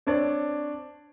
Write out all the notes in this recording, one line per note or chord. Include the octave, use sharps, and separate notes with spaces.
C4 D4 C#5 D5